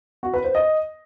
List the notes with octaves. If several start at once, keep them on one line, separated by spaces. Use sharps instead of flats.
F#4
B4
C5
D#5